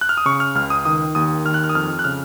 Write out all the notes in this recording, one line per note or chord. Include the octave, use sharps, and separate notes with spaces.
F#6
F6
D#6
C#3 C#6
F6
C#2 F6
D#6
D#3 D#6
D#2 D#6
D#3 F6
F#6
F6
D#6
F2 F6
F#6
C#3 F6